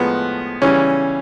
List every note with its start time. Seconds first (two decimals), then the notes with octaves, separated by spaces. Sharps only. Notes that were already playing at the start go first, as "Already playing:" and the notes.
Already playing: A2 F3 G#3 B3
0.62 C#3 E3 G3 C#4